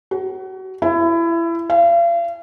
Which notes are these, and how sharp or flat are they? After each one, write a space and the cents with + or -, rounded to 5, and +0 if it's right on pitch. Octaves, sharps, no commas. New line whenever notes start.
F#4 +30
E4 +25
F5 -40